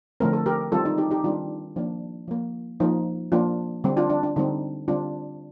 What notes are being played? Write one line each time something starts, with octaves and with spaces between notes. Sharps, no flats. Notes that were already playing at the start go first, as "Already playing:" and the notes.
D3 F3 A3 C4 A#4
A4
G4 A#4
D#3 G3 C4 F4 A4
D#4
D#4 G4
D#4 G4
D#3 G3 C4 D4 F4
F3 A#3 D4
F3 A#3
F3 A#3 D#4
F3 A#3 D4 F4
D3 G3 C4
D4 F4
D4
D4
D3 G3 C4 D#4
D3 G3 C4 D4 F4